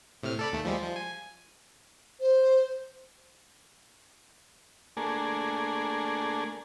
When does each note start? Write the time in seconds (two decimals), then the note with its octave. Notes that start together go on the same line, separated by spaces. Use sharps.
0.23 A2 C3 F6
0.39 A4 D5 B5
0.52 D#2 A3
0.65 F3 G3 G#3
0.82 F3
0.96 G#5
2.20 C5
4.97 A3 A#3 D4 G#4